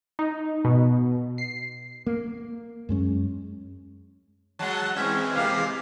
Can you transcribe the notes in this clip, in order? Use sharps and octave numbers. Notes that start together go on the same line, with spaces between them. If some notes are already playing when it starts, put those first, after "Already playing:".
D#4
B2
C7
A#3
F#2 G#3 C#4
F#3 G#3 F#5 A5
E3 G#3 C4 C#4 E5
C3 A#3 F5